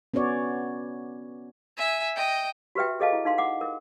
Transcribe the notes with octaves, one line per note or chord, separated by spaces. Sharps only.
B3 C#4 F#4 C#5 D5
E5 G#5
D#5 G5
F#4 G4 B4 E5 G5
G#4 A4 D#5 F5 A5
E4
D#4 F5 C6
F#5 D6
A#4